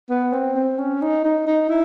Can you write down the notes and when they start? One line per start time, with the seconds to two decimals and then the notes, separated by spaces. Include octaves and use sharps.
0.10 B3
0.33 C4
0.55 C4
0.78 C#4
1.02 D#4
1.24 D#4
1.46 D#4
1.69 E4